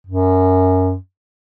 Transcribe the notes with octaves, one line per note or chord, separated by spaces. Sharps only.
F#2